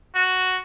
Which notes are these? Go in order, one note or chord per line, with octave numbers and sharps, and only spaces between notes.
F#4